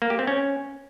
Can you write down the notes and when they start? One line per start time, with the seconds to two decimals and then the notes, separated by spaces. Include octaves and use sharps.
0.02 A#3
0.10 G4
0.19 C4
0.27 C#4